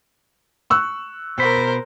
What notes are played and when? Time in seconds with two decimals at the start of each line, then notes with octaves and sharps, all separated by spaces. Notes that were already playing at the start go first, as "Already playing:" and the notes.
0.70 C#6 E6 F#6
1.38 B2 A#4 C5 B5